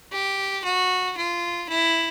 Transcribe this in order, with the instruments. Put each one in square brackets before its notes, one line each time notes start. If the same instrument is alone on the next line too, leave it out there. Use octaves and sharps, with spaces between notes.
[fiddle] G4
F#4
F4
E4